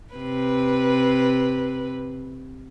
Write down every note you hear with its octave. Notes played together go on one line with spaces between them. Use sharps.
C3 B4